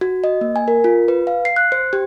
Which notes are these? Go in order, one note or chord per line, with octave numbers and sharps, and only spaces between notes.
F#4
D#5
A#3
G#5
A#4
F4
B4
F5
C7
F#6
C5
G4